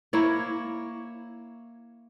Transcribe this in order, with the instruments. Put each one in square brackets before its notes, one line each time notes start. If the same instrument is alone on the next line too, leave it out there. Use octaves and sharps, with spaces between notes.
[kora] A#3 E4 C#5